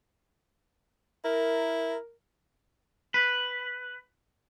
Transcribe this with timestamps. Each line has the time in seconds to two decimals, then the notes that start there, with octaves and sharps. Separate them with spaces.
1.24 E4 A#4
3.14 B4